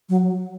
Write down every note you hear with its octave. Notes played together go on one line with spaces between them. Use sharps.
F#3